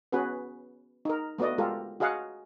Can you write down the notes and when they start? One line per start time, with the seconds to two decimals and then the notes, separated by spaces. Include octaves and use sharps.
0.12 B3 C#4 F#4 G#4 B4
1.05 D#4 A#4
1.38 A3 B3 F#4 D5 D#5
1.58 G#3 F4 G4 A4 A#4
2.00 F#4 G#4 D#5 F5 F#5